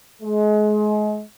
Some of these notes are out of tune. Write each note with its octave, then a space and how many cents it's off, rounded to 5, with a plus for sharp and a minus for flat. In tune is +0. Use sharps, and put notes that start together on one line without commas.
G#3 +30